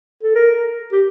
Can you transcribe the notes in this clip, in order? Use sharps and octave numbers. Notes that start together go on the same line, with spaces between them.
A4
A#4
G4